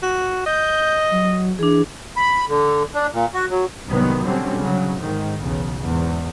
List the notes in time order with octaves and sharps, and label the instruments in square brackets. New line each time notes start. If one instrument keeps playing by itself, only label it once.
[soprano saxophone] F#4
[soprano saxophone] D#5 [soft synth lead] G6
[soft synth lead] F#3
[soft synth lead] E3 [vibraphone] D4 G#4
[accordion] B5
D3
D4
A#2
F#4
F#3
[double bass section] C2 G#2 C3 D#3 F#3 B3
B2 D3 F#3 G3 C4 C#4
C#3 F#3
G#2 D#3
B1 E2 C#3
E2 G#2